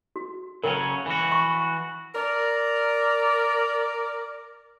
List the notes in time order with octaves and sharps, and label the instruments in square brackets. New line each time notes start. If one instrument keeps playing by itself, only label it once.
[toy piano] F#4
[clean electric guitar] C#3 F#3 C#4 [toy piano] A#4 G#5
[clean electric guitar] E3 F#4
[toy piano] C#6
[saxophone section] A#4 D5